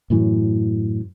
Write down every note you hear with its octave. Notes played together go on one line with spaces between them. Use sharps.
F#2 A2 E3 F#3